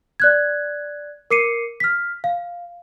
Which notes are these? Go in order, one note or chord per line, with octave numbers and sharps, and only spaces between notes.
D5 F#6 G#6
A#4 D6 C7 C#7 D#7
F6 B6
F5